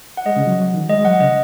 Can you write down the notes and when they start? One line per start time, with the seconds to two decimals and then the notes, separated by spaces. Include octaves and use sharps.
0.17 F#5
0.25 G#3 D#5
0.36 C#3
0.47 F#3
0.58 F#3
0.73 D#3
0.89 G#3 D#5
1.05 F#3 F#5
1.20 C#3 D#5